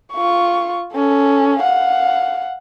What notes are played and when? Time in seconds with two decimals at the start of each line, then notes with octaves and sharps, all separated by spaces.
0.14 F4 C#6
0.93 C#4 A4
1.59 F5 F#5